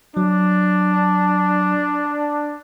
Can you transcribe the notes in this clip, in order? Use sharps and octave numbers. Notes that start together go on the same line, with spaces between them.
F#3 D4